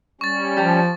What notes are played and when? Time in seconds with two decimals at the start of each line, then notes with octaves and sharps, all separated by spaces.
0.21 G3 C#4 C#6 A6
0.57 F3 G4 A5 A#5